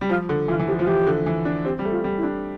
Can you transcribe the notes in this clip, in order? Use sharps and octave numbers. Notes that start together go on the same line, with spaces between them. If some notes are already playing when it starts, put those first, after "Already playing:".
G3
F3 F4
D3
E3 F4
E3
F3 G4
F3 F4
E3 G4
D3
E3
D4
C4 G4
G3
A3
F4
G3
E4
D4